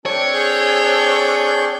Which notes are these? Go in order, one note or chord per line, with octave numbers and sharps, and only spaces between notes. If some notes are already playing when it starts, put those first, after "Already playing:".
C4 D4 A4 C#5 G5
G#4 G6